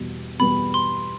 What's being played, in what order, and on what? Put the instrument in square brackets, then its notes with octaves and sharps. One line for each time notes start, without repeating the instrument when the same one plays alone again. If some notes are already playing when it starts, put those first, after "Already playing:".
Already playing: [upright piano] E2 B2 G3 B3
[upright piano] E2 B2 G3 B3 [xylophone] B5
[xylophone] C6